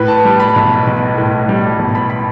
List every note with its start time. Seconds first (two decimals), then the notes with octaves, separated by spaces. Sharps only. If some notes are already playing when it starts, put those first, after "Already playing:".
Already playing: A2 B4
0.08 A5
0.25 G3
0.40 B5
0.56 B1
0.87 B1
1.18 A2
1.49 G3
1.79 B1
1.95 B5
2.10 B5